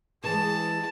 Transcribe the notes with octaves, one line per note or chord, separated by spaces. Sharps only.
E3 G#3 G#4 A5